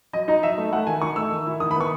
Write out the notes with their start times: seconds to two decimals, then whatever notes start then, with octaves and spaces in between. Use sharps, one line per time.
0.13 F#3 D#5
0.28 D#4 D#5
0.43 F#3 E5
0.58 A3
0.72 A3 F#5
0.87 D#3 G#5
1.02 D#4 C#6
1.16 A3 E6
1.32 D#3
1.47 E4
1.60 D#3 D#6
1.71 B5
1.76 B3 C#6